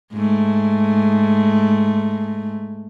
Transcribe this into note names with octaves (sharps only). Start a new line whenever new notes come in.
G#2 A3